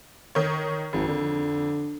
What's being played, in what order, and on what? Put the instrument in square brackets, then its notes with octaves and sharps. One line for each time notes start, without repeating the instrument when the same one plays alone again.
[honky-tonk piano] D#3 C#5
[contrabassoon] G#1 [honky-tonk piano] F2
[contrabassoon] D3